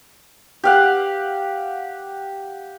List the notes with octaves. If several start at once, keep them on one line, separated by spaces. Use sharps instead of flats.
G4 F5 F#5